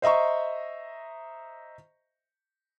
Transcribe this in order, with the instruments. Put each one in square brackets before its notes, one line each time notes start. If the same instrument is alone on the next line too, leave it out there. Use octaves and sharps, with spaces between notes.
[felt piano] C5 D#5 E5 A#5 C#6